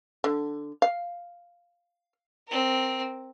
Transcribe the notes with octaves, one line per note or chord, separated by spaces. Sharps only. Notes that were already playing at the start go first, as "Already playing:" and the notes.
D3
F5
C4 A#4